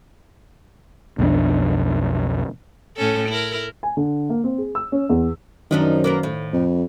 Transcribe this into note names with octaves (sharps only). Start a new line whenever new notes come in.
B1 F2 F3 D4
A2 C#4 A4
E4 A#4
G#5
D3
A#3
C4
G#4
E6
C#4
E2
F#2 D#3 F3 D4 D#4
A#3 B3 A#4
A2
F2